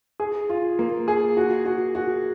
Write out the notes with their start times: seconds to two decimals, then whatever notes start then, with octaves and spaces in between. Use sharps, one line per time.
0.20 G#4
0.50 F4
0.79 A#3
1.08 G#4
1.37 F#4
1.65 F#4
1.95 F#4